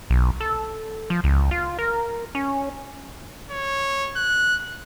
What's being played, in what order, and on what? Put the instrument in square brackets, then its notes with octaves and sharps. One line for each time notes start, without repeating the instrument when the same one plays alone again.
[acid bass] B1
A4
F3
C#2
F4
A#4
C#4
[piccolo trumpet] C#5
F#6